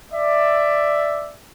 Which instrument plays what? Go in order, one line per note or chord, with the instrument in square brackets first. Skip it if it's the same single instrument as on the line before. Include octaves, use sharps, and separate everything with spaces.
[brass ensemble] D5 E5